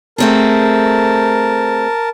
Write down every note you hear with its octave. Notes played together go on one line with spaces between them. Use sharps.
A3 C4 G#4 A#4 A5